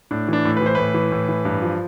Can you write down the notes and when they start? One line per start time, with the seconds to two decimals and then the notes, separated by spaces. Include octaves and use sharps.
0.11 A2 D4
0.28 E3 D4
0.45 A2
0.57 B4
0.62 E3 C5
0.75 A2 B4
0.94 E3
1.12 A2
1.29 E3
1.45 G2
1.62 F3